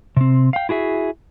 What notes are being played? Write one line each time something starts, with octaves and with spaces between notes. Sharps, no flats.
C3 C4
F5 G5
E4 F#4 G#4 E5